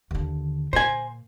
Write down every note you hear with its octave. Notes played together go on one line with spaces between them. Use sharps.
D#2 D3
A#2 C5 G#5